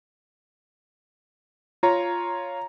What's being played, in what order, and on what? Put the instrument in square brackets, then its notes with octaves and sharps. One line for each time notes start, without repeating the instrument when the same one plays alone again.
[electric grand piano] F4 C#5 [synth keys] A#5